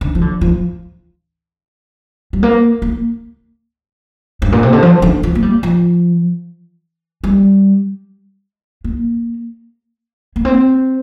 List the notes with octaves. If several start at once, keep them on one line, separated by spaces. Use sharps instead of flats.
D3
F3
D3
F3
G3
A#3
A#3
G2
A#2
C3
D3
F3
D3
F3
A#3
G3
F3
G3
A#3
A#3
C4